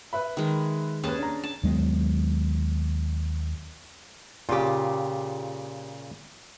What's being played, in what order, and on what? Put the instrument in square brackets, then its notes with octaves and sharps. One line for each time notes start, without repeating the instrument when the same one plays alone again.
[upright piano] B4 E5 B5
[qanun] D#3 G#3
[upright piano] D#2 B4 [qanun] C#4 G#4 A5
[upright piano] D4 A#5
[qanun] A5
[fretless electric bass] D#2 F#3 G#3 B3
[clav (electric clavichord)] A#2 C#3 [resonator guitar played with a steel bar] F4 G4